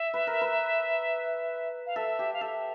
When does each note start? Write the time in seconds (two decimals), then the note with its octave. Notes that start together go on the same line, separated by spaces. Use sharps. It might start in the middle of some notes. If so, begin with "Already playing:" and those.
Already playing: E5
0.14 B4
0.27 A#4
0.41 B4
1.86 F5
1.96 A4 E5
2.19 G4
2.33 F5
2.41 A4 E5